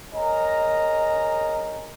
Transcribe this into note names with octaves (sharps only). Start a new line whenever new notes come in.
G#4 A#4 C#5 D#5 G#5 A#5